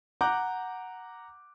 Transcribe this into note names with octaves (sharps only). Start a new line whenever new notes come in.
F#5 A#5 D6 F#6 G6